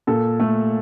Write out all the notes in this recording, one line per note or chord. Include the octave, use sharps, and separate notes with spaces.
A#2 A4
A3